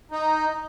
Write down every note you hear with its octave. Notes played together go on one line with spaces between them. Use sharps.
D#4